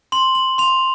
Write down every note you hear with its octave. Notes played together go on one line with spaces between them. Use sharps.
C6 F#7
F#7
C6 F7